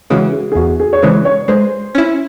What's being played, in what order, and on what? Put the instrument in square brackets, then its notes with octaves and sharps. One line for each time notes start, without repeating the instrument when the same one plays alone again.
[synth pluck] C#3 E3 G#3 [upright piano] F#4
[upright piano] G#4
G#4
[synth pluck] E2 [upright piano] F#4
[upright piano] G#4
C#5
[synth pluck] C#3 E3 G#3 [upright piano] C5
[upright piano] C#5
[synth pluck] G#3 [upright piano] C5
[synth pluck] C#4 E4